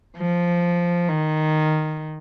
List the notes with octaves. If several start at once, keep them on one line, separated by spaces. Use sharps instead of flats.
F3
D#3